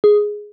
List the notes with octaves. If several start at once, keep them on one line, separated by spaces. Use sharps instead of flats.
G#4